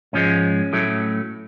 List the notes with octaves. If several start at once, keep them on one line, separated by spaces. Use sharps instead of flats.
G#2 F3 G#3 C#4
A2 F#3 A3